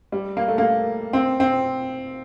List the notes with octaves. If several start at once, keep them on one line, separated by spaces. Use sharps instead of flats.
G3
A#3
A3
A#3
C4
C4